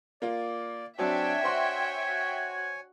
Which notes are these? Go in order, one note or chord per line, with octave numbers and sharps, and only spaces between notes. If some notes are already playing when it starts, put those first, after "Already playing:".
A#3 F4 D5
F#3 C4 D4 F#4 C#5 E5 G5 G#5
F#4 C5 C6
F#4